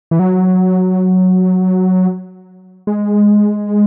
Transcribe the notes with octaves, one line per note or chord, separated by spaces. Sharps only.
E3
F#3
G#3